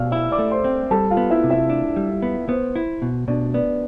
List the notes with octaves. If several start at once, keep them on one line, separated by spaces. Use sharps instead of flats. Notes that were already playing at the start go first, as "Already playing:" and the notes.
Already playing: B2 D5 F5 E6 F6
E4 E5 E6
D5 D6
A3
C5 C6
C4
G3 A4 A5
F4 F5
B3
E4 E5
C3
E4 E5
D4
G3
B3
B3 C5
E4
B2
B2 D4 D5
B3 D4 D5